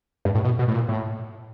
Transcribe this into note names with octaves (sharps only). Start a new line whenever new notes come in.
G2
A2
B2
B2
A2
A#2
A2